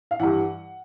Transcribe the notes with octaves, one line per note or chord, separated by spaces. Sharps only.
F5
G2 E3 F#5